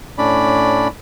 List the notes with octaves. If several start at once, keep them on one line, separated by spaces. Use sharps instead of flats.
A2 C#4 D4 D5 B5